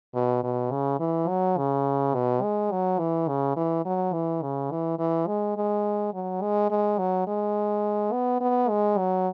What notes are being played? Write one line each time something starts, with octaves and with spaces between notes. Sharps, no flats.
B2
B2
C#3
E3
F#3
C#3
B2
G#3
F#3
E3
C#3
E3
F#3
E3
C#3
E3
E3
G#3
G#3
F#3
G#3
G#3
F#3
G#3
B3
B3
G#3
F#3